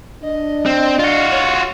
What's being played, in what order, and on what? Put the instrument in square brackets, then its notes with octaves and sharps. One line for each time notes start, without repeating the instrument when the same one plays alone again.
[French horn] D4 [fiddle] D#5
[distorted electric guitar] C4
F4 F#4
[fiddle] C#5